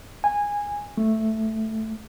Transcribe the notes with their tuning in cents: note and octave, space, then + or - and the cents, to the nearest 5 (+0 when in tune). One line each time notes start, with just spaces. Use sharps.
G#5 -15
A3 +0